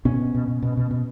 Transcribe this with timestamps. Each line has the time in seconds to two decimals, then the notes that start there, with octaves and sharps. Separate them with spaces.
0.05 B2 B3 C#4
0.20 B2
0.35 B2
0.48 B2
0.62 B2
0.77 B2
0.91 B2